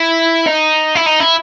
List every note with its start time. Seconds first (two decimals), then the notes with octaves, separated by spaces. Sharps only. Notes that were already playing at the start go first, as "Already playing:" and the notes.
Already playing: E4
0.47 D#4
0.95 E4
1.06 D#4
1.20 E4